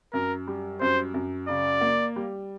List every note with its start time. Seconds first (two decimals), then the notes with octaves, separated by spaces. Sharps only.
0.13 F#2 A#4
0.47 G3
0.80 F#2 C5
1.14 F#2
1.49 C#3 D5
1.81 A#3
2.16 G3